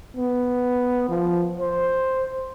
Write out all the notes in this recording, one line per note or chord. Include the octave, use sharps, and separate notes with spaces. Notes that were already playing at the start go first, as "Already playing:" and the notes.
B3
F3
C5